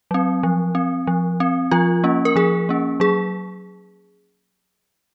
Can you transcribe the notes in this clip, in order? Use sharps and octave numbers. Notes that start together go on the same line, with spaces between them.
F#3 C4
F3
C4
F3
C4
F3 F4
A#3 C#4
A#4
F3 G#4
A#3 C#4
F#3 G#4